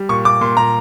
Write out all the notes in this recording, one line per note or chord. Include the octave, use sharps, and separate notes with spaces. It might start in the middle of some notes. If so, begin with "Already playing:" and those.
Already playing: G3
A#2 C#6
A#2 D6
A#2 C6
A#2 A#5